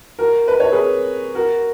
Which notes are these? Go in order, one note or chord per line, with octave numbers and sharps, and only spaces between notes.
F#4 A#4
B4
C#5
G#4 B4
F#4 A#4